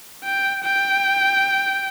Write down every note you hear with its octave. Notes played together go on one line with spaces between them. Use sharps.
G5
G5